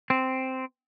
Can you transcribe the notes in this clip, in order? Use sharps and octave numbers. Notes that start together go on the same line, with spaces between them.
C4